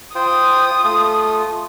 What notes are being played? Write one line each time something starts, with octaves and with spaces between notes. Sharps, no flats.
F4 C5 G5 D#6
A3 F4